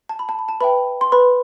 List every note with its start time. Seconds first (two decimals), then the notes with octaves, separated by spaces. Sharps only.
0.09 A5
0.19 B5
0.29 A5
0.39 B5
0.48 A5
0.61 B4 E5 G5 B5
1.01 C6
1.12 B4 B5